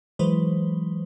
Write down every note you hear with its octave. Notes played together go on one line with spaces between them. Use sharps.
E3 F#3 G#3 E4 B4 C5